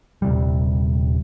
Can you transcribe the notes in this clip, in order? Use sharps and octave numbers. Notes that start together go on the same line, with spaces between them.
D#1 C3 G3